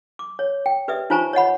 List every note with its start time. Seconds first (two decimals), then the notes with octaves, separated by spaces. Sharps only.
0.19 D6
0.39 C#5
0.66 G5
0.88 G4 B4 D5 E5 D#6
1.10 D#4 F4 C5 G#5 A#5 C#6
1.33 C#5 D#5 F#5 B5